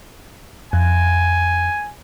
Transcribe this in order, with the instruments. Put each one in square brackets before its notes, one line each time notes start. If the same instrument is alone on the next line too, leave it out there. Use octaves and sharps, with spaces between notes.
[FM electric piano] F2 [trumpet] G#5